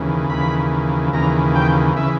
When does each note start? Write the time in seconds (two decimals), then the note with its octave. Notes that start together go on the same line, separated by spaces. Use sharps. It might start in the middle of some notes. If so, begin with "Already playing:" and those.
Already playing: D#2 C#3 E3
0.30 D#2 C#3 E3 B5
1.13 D#2 C#3 E3 A#5
1.55 G5
1.96 C#3 E3 E5